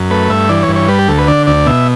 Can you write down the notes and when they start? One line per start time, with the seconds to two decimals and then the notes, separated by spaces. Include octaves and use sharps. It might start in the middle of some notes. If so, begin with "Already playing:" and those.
Already playing: F#2
0.10 A3 B4
0.30 G2 E5
0.49 E3 D5
0.63 C#5
0.68 G2
0.76 C#5
0.89 G3 B4
0.99 G4
1.08 D2 A4
1.18 B4
1.28 D3 D5
1.47 D2 D5
1.66 B2 E5